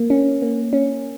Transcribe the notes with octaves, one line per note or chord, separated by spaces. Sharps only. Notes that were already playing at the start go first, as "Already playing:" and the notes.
Already playing: A#3
C#4
A#3
C#4